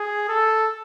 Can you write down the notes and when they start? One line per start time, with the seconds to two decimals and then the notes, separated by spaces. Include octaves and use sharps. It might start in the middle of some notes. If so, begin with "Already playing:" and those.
Already playing: G#4
0.29 A4